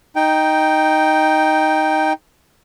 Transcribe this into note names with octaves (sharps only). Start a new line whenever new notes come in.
D#4 G5